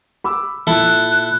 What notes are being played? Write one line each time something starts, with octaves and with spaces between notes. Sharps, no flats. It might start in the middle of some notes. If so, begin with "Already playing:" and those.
B5 D6 E6
A#2 E4 A4 F#6